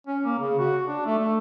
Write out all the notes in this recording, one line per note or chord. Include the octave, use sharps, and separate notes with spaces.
C#4
A#3
C#3
F#4
D4
A3
A3